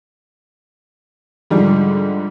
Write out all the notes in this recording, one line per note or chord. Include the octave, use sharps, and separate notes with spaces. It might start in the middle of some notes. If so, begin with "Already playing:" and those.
G#2 D3 F3 G3